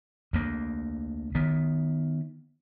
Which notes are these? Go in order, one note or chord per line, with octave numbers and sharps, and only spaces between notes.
D2 A#3
D#3 B3